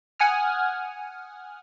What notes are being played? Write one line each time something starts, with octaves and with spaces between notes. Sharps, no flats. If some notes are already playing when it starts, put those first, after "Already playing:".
F#5 G#5 D#6 F6